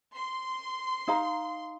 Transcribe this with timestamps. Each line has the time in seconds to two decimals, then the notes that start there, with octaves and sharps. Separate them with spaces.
0.16 C6
1.08 D#4 F5 A#5